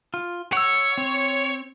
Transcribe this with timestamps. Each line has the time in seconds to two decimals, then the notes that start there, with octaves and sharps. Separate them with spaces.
0.14 F4
0.53 C#5 F#5 E6
0.98 C4